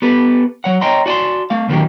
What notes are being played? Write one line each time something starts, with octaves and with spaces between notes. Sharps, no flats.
B3 G4 A4 B4
F#3 C#5 F#5
C#5 D#5 G5 A#5 C6
F#4 D5 G#5 A5 C6
A3 F5
D#2 A#2 D3 D#3 F#3 G4